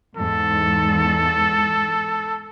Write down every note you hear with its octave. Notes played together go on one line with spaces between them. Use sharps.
E2 G#2 A4